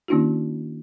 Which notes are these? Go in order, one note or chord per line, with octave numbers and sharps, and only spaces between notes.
D#3 A#3 C#4 D4 E4 F#4